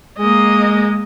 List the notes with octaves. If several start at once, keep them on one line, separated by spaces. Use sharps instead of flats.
G#3 A#3 D#5